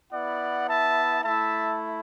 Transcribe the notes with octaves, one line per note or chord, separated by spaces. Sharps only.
B3 E4 D5 F#5
E5 A5
A3 E4 E5 A5